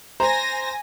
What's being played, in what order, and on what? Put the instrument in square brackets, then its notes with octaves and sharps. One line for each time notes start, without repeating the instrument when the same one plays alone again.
[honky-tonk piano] C5 A#5 [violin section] G#5 A#6